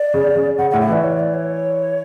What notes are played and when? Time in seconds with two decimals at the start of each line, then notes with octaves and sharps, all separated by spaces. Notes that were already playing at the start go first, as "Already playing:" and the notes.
Already playing: D5
0.14 C#3
0.36 C#3
0.58 C#3 F#5
0.71 A2 F#5
0.81 E5
0.89 E3 D5
1.04 C#5
1.19 D5
1.34 C#5